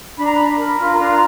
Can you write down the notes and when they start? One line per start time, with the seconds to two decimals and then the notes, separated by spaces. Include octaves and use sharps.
0.17 D4 B5
0.25 A#5
0.34 D4 B5
0.57 A#4
0.78 F4
0.98 D4 A#5